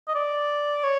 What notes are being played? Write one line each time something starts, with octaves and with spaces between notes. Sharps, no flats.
D#5
D5
C#5